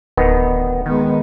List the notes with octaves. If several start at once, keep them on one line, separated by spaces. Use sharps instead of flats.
D1 D#3 B3
D#3 G#3 B3